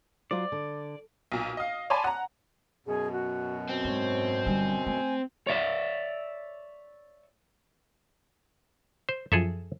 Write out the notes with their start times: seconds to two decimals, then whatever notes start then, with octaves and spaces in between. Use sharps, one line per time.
0.31 F#3 F4 C5 D5
0.52 D3
1.32 B1 A#2
1.57 D#5 F5
1.90 C#5 D5 G#5 A5 B5 C6
2.04 F#5 A#5
2.87 F#2 B2 G#4
3.12 F#4
3.69 C4
3.85 G#2 C#5
4.45 G1 G3 G#5
4.86 A3 G#5
5.47 C#5 D5 E5
9.09 C5
9.32 F#2 F3 G#4 A4 E5